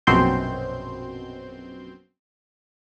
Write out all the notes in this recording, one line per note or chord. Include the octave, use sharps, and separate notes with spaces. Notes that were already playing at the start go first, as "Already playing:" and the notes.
A#1 F#2 B2 C4 C6 G6